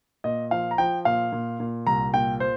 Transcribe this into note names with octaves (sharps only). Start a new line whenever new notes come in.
A#2 D#5
F3 F5
A#5
F3 G5
A#2 F5
A#2
A#2
C2 A#5
A#2 G5
C5